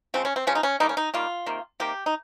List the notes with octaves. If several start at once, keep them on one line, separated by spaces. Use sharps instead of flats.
C#3 F3 G#3 C4
C#4
C4
C#3 F3 G#3 C#4
D#4
C#4
D#3 G3 A#3 D#4
C#4
D#4
D#3 G3 A#3 F4
C3 D#3 A#3
C3 D#3 A#3 G4
D#4